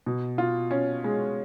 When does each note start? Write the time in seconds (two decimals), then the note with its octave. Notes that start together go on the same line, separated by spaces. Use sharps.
0.06 B2
0.38 F4
0.71 C#4
1.04 G#3